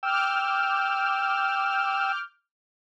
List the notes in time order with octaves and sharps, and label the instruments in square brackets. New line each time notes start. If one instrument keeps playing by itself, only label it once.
[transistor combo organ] G5 E6 [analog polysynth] D6 F6 G6